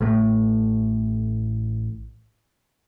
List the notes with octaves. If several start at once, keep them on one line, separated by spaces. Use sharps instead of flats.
A1 A2